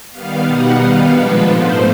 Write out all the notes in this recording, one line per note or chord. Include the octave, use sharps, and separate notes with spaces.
D#3 G3 B3 F5
B2 G3 B3 D#4 F#5
D#3 G3 B3 F5
A#2 F3 G#3 B3 D4 B4
G#2 F3 A3 C5